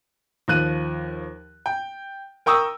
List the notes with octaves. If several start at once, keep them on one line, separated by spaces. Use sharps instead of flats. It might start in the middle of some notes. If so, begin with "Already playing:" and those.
D#2 F3 F#6 D#7
G5
A#4 G5 C#6 D#6 E6